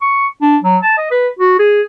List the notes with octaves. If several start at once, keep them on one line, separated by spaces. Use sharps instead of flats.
C#6
D4
F#3
A5
D#5
B4
F#4
G#4